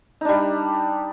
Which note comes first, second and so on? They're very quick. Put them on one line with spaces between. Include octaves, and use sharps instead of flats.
D#4 D4 G3